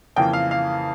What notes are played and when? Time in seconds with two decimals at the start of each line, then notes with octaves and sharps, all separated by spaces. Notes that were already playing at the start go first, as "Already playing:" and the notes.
0.16 F2 C#3 E3 A#3 G5
0.33 F5
0.51 F5